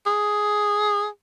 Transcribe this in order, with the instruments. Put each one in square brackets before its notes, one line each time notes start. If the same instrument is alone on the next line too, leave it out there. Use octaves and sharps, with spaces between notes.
[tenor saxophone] G#4